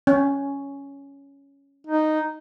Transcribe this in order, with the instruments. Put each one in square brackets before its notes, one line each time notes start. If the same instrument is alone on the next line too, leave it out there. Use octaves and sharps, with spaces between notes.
[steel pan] C#4
[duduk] D#4